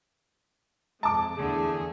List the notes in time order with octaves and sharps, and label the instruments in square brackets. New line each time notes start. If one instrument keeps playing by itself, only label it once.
[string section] F2 G#3 [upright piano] A5 D6
[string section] E2 D3 A3 [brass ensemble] G#4